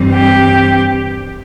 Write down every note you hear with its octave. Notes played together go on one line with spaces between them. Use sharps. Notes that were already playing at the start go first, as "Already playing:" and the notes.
Already playing: G2 E3 G3 C4
G4